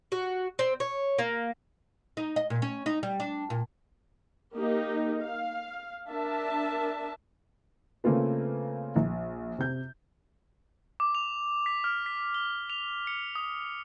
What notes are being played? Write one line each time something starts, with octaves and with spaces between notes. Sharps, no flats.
F#4
C4
C#5
A#3
D#4
D#5
A#2
C#4
D#4
G3
D4
A#2
A#3 D#4 G4
F5
D4 A#4 E5 A5
C#3 A3 A#3 C4 F4 B4
A#1
C3 G6
D6
F7
B6
F6
B6
G7
F7
C#7
D#6